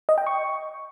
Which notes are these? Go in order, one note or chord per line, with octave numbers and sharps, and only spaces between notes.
D#5
G5
C#6